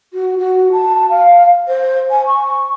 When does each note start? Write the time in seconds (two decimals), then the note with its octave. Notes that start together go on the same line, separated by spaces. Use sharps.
0.13 F#4
0.38 F#4
0.71 A5
1.09 F5
1.67 C5
2.11 G#5
2.26 C#6